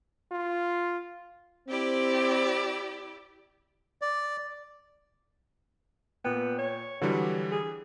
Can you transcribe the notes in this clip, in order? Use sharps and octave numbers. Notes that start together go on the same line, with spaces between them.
F4
C4 E4 G4 D5
D5
A#2 B3 G5
C#5
D3 E3 F#3 G3
G#4